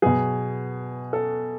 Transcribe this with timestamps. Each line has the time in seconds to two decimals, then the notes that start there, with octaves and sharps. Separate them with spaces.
0.02 B2 F#3 G#4
1.13 A4